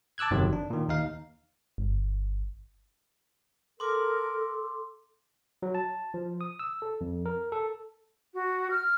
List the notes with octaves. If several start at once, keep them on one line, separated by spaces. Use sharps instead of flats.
A5 D6 E6 F#6 G#6
G1 F2 C3 D#3 F#3
D4
A#2 D#3
D#2 D#4 F5
G1
A4 A#4 C6 D6
F#3
A5
F3
D#6
E6
A4
F2
A#4
A4
F#4
F6